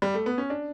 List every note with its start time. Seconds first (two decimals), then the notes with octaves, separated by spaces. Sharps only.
0.02 G3
0.14 A3
0.26 B3
0.38 C#4
0.50 D4